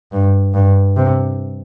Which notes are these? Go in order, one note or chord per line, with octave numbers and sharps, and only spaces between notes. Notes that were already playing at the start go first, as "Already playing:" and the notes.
G2
G2
C3